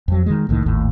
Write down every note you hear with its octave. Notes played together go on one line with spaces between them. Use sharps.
F2 F#3
D#3 G#3
C2 A2 D#3
G#1 D#2 A2